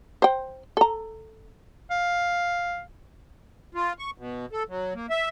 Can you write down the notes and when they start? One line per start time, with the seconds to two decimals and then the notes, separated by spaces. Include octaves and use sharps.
0.22 C5 G5
0.77 A4 A#5
1.91 F5
3.75 F4
3.99 C#6
4.18 B2
4.52 A4
4.69 F#3
4.94 A#3
5.10 E5